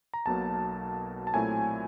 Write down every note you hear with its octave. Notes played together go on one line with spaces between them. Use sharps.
A#5
B1 B2 F#3 A#3 A5
A5
A#2 F#3 A3 C4 E4 G#5